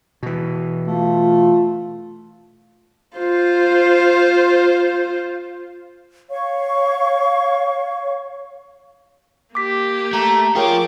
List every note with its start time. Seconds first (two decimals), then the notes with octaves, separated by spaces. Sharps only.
0.23 B2 E3
0.87 A3 F4
3.17 F4 C5
6.30 C#5 F5 C#6
9.55 A#3 G4 D6 B6
10.13 A3 A#5
10.55 F3 F4 G#4 A#4 C#5 G5 C#6 D6